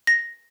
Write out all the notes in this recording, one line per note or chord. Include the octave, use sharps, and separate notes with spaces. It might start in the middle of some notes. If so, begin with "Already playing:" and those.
A#6